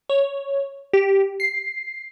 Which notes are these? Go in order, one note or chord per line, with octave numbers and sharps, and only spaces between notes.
C#5
G4
C7